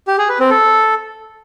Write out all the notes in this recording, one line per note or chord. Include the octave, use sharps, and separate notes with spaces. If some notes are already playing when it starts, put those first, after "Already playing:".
G4
G#4
B4
C4
A4